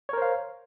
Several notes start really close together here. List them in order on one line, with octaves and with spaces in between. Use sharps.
C#5 A#4 C5 F5